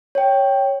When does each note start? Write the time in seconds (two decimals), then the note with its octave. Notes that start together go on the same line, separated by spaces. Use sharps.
0.15 C#5 G5